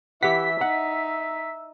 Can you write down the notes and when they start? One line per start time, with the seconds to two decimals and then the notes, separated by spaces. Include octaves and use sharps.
0.23 E3 G4 E5 F#5 B6
0.61 D#4 F#5